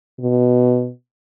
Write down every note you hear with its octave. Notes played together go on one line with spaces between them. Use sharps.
B2